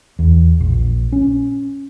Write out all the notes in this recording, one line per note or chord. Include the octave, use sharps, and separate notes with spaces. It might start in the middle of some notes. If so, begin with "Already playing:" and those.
E2
A#1
C#4